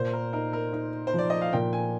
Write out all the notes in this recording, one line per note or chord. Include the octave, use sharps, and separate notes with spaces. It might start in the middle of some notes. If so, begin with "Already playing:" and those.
Already playing: A#2 C5
A#4
D#4 A#4
A#4
D#4
C5
F3 D5
D#5
F5
A#2 G5
G#5